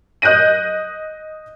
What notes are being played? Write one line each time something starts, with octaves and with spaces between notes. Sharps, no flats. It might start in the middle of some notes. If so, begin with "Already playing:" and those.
D#5 F#6 G6 A#6 D#7